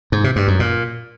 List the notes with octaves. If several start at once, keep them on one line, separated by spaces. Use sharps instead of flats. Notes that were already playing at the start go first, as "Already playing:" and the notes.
G#2
C3
G2
F#2
A#2